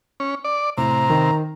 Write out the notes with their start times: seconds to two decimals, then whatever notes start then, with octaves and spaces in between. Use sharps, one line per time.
0.20 C#4
0.44 D5
0.77 A2 C3 A#5
1.10 D#3